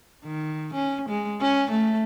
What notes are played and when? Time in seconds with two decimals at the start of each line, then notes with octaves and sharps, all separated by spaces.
0.24 D#3
0.74 C#4
1.09 G#3
1.41 C#4
1.71 A3